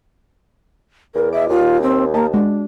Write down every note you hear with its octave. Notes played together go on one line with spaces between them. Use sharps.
E2 A#4
D#5 E5 D6
D#2 F4
C4
A#3 G4 D#5 A5
G#3 D4 F#4